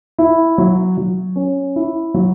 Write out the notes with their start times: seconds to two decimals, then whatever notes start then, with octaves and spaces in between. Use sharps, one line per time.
0.18 E4
0.58 F#3
0.97 F#3
1.36 C#4
1.76 E4
2.14 F#3